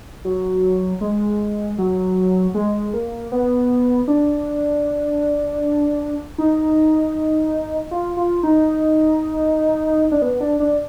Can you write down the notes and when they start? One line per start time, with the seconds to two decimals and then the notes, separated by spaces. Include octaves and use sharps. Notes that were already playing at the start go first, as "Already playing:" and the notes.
0.25 F#3
1.01 G#3
1.78 F#3
2.54 G#3
2.93 A#3
3.32 B3
4.08 D4
6.38 D#4
7.91 F4
8.17 F4
8.43 D#4
10.12 D4
10.22 B3
10.40 D4
10.60 D4